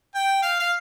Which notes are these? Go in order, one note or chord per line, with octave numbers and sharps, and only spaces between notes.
G5
F5
F5